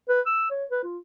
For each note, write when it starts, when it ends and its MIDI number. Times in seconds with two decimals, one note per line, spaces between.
0.09 0.21 71
0.26 0.48 88
0.50 0.65 73
0.71 0.82 71
0.83 0.98 65